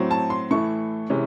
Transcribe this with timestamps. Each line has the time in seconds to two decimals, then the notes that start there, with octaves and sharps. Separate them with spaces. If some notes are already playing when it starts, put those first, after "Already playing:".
Already playing: A2 F#3 C4
0.11 A5
0.30 C6
0.51 A2 E3 A3 C#6
1.10 C3 E3 G#3 C#4